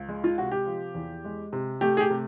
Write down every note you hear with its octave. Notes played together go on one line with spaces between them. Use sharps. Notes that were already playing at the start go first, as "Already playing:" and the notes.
Already playing: C#2
G#3
F4
C3 F#4
G4
F3
E2
G#3
C3
A3 G4
G#4
G4
C3